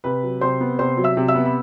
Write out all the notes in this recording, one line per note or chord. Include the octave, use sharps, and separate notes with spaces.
C3 B4 B5
F#3
C3 C5 C6
B3
C3 C5 C6
F#3
E5 E6
C3
E5 E6
B3
B5